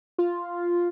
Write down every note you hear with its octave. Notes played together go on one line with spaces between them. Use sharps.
F4